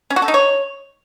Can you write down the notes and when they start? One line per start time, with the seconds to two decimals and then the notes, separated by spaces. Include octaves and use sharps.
0.10 C#4
0.16 F#4
0.22 A4
0.28 D#4
0.34 C#5